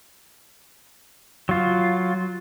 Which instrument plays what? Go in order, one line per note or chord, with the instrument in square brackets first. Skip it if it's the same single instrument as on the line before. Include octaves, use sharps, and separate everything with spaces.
[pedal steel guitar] F#3 F4